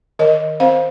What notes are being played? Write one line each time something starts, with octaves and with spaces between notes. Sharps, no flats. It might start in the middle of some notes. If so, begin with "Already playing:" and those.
D#3 A#4 D#5
C4 C5 F5